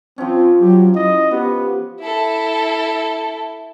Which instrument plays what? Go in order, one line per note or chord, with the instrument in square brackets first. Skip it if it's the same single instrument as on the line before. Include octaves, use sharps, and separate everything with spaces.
[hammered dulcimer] F3 C#4 [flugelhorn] C4
[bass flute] F#3 [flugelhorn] G4
[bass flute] E4 [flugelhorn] D#5
[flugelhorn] B3 [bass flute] G4
[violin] E4 A4